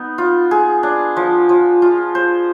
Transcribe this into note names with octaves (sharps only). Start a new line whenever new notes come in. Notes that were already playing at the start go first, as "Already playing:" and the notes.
Already playing: B3 D#4
F4
G#4
D4
F3
F3
F4
C5